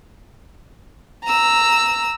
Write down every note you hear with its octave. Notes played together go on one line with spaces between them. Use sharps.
A#5 E6